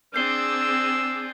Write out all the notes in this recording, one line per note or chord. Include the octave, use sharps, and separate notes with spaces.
C4 D4 G#4 E6 G6 C7 G7